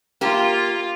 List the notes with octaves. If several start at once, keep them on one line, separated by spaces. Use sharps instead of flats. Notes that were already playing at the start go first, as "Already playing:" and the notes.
A#3 F4 G4